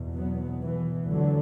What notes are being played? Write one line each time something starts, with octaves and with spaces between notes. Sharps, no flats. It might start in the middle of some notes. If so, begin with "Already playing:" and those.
Already playing: E2 B2
F#3 B3
E3
D2 D3 F#3